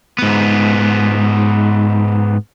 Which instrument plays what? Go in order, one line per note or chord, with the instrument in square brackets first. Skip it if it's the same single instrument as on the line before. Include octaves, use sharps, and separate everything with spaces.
[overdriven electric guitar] G#2 B3